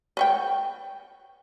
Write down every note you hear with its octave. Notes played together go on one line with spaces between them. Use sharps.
B4 C#5 G5